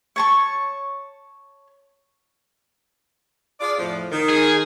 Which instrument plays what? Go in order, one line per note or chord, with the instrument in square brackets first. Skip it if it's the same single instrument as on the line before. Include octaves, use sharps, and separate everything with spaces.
[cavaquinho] C#5 A5 C#6
[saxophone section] F4 G#4 D5
F2 A2 F3
D#3
[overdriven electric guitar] G#4